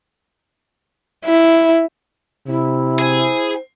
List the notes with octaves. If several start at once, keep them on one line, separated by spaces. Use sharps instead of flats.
E4
C3 E4
G#4 C5 G#5